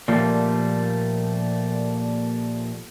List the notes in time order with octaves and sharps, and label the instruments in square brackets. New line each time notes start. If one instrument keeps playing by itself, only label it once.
[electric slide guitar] A#2 F3 G3 A3 A#3